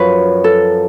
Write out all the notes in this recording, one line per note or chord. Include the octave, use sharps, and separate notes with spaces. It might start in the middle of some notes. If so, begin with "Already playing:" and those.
Already playing: F#2 F3 B4 C#5
A4